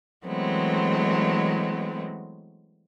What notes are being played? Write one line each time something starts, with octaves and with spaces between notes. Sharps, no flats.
E3 F#3 G#3 A3 B3 C4